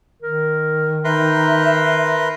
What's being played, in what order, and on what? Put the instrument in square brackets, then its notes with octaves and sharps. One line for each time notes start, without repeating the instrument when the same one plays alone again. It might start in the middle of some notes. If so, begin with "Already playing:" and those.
[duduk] D#3 [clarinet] A#4
[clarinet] D#4 [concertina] A#4 B4 C6 [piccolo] E5